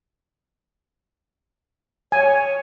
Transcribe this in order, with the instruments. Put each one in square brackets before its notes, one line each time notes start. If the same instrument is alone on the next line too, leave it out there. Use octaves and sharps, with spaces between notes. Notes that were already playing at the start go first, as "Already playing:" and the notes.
[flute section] C#5 [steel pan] G#5